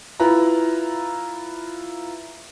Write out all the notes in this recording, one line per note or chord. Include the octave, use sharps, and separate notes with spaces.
E4 F4 B4 A#5